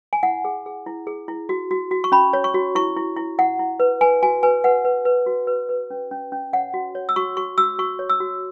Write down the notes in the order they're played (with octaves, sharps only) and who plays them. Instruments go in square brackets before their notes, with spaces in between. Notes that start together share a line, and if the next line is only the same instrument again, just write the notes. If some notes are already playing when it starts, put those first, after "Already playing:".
[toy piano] G#5
E4 F#5
G#4
G#4
E4
G#4
E4
F#4
F#4
F#4
C#6
C#4 B5
C#5
C#6
F#4
E4 C#6
E4
E4
E4 F#5
E4
B4
B4 G#5
F#4 G#5
B4 G#5
B4 F#5
B4
B4
F#4
B4
B4
C#4
C#4
C#4
C#5 F#5
F#4
C#5
E6
F#4 C#6
F#4 C#6
F#4 E6
F#4 C#6
C#5
E6
F#4